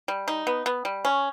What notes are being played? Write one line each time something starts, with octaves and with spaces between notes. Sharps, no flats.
G3
D#4
B3
B3
G3
C#4